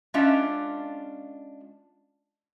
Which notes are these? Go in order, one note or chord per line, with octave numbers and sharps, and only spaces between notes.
G#3 C#4 D4 F4 E5